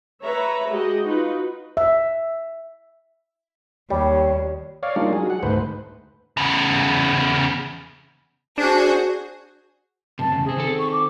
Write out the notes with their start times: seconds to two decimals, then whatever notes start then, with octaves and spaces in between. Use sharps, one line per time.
0.23 B4 C#5 E5 A#5
0.69 G#3 F#4 G4 D#5
1.06 D#4 F4 F#4 B4
1.77 E5
3.90 D#2 G3 C#5
4.83 C#5 D5 F5
4.96 G3 G#3 A#3 D4 D#4 F4
5.13 F#3 G#4
5.30 F#5
5.43 D2 G#2 A3 B4 C5
6.37 E2 C#3
8.58 D4 F#4 G#4 C5
10.19 F#2 C3 A5
10.32 E2 G#2 C#3
10.45 C3 C4 G#4
10.57 D#3 C4 A4
10.79 C#6
10.93 D6